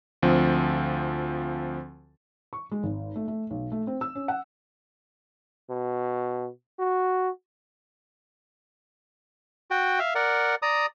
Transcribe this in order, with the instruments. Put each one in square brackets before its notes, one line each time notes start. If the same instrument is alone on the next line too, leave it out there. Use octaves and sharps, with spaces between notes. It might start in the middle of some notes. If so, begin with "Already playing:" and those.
[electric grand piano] D2 F3 C4
[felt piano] C#6
G#3
G#1
A3
A3
B1
A3
C4
E6
C#4
F#5
[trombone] B2
F#4
[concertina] F#4 G5
E5 F5
A#4 D5 F#5
D5 A#5 D#6